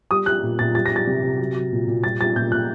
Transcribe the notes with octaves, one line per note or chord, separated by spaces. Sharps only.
G3 D#6
G3 F#6
A#2
A#2 A6
G3 A6
A#6
G3 A6
C3
C3
F#3
F#3
A#2
A#2
G3 A6
G3 A6
A#2 G6
A#2 F#6